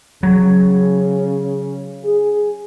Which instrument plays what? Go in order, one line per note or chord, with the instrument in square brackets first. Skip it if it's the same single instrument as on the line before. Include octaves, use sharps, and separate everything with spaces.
[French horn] C#3 [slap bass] F#3
[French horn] G#4